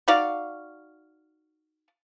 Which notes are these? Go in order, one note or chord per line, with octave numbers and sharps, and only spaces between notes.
D#4 F#4 D5 F5